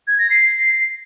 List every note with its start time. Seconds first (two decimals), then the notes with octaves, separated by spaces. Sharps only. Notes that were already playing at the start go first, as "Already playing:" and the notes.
0.07 G#6
0.19 A#6
0.30 C7